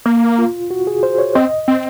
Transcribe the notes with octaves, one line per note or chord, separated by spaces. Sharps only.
A#3
F4
F#4
G#4
C5
C#5
C4 D#5
C4